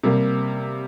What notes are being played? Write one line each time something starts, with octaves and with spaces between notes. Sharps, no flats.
C3 G3 A#3